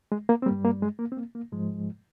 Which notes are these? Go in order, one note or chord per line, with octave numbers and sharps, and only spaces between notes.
G#3
A#3
C4
G2 G3 A#3
A#3
G#3
A#3
C4
A#3
A#3
G#2 F3 G#3